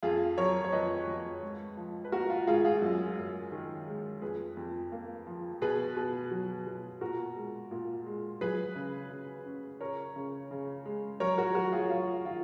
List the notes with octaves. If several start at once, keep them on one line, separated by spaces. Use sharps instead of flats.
F2 F4 G#4
F#3 A#4 C#5
C#5
F2 B4 D#5
F2
G#2
F3
B4
A#3 F#4 A#4
F4
G#2 F4 G#4
F4 G#4
F#2
F#2
D#3
G#3
F2 G#4 B4
F2
A#3
F3
B2 G#4 B4
B2
F#3
B2
A#2 F#4 A#4
G#3
A#2
G#3
F#3 G#4 B4
C#3
C#3
C#4
C#3 A#4 C#5
C#3
C#3
G#3
F#3 A#4 C#5
F#4 A#4
F#3 F#4 A#4
F4 G#4
F#3 F4
D#3 F4